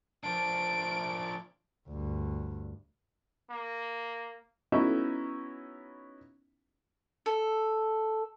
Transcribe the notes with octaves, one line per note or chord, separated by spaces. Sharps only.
F3 D4 D7
D2 G2
A#3
B3 C#4 D#4 E4 F#4 E5
A4